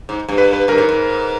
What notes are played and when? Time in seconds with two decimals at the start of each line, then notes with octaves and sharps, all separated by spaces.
0.09 G#2
0.28 G2
0.38 B4
0.53 B4
0.68 G2 A#4
0.78 G#2
0.89 G#2